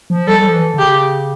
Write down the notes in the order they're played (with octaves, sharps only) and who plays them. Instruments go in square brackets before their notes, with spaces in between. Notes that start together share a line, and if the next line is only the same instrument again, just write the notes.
[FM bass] F3
[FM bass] G3 [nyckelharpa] A4
[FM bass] G3
F3
E3
D3
[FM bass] C#3 [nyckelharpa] G4